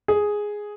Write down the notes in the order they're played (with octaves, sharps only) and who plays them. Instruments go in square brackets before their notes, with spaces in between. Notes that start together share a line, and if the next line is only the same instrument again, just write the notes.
[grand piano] G#4